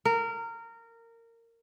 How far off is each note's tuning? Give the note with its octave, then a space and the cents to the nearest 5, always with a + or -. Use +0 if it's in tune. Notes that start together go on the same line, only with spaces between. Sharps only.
A#4 -20